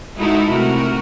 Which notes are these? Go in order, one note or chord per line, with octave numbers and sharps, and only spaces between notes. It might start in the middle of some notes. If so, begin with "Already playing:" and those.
G#3 D#4 E4 F#4 A4
C3 A3 F#4 A#4